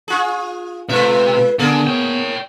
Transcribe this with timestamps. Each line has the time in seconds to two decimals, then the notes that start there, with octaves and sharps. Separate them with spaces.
0.08 F4 G#4
0.89 C3 G#3 F4 B4 E5
1.59 D3 A#3 B3 G#4 A#4
1.87 C#5 G5